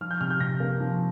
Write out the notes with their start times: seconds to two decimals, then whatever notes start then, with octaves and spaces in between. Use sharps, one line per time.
0.01 F3 F6
0.11 G6
0.21 C3 F6
0.30 G6
0.40 C3 A#6
0.60 A#3
0.80 F3